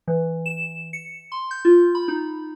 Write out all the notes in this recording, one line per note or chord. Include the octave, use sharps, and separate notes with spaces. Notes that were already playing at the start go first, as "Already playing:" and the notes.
E3
E7
C#7
C6
G6
F4
B5
D#4